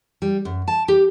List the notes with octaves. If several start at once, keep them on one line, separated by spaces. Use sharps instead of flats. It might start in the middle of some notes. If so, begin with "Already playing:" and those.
G3
F#2
A5
G4